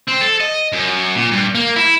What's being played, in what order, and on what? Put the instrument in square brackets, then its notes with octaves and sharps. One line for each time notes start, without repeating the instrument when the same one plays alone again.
[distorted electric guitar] C4
A4
D#5
F#2
A#2
G2
A#3
E4